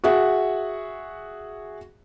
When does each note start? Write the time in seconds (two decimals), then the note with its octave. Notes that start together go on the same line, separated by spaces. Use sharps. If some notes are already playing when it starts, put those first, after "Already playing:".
0.04 F#4 G#4 E5 F#5